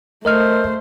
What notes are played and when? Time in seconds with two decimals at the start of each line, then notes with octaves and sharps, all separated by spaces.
0.25 A3 A#4 C5 D#5 F6